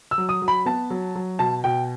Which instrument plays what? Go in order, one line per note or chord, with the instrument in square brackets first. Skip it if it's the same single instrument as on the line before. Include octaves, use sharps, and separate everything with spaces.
[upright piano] E6
F#3
D#6
F#3
B5
B3 A5
F#3
F#3
B2 A5
B2 G5